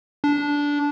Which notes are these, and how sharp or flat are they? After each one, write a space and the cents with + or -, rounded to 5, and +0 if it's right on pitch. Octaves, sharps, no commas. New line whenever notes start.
D4 -15